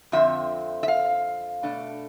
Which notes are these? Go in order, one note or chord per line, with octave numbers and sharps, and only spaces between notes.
F2 D3 F3 C4 E5
E5
F5
B2 A3 D4